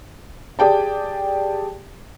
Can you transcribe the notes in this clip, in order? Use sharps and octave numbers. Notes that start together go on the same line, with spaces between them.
G4 G#4 D5 G5 A5